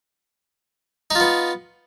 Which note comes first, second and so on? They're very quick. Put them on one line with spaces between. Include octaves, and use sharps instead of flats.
D#4 F4 B3